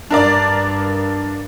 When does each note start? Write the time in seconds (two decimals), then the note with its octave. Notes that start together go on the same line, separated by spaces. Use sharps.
0.11 G2 D4 A#4 D5